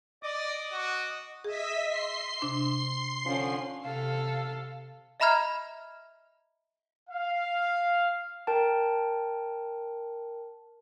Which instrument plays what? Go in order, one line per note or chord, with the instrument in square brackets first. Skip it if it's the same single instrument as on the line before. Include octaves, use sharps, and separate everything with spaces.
[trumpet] D5 [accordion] D#5 D6 D#6
[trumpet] F#4
[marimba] G#4 [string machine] D#5 E5 B6
[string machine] C6 C7
[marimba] C3 D4
[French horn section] D3 F3 C#4
[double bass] C3 [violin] A4 [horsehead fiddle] F5
[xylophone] D#5 E5 A#5 B5 F6 G#6
[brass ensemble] F5
[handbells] A#4 G5 A5